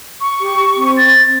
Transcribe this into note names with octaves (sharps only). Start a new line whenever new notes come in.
C#6
G4
C4
A6